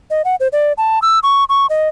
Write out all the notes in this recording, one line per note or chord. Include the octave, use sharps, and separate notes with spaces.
D#5
F#5
C5
D5
A5
E6
C#6
C#6
D#5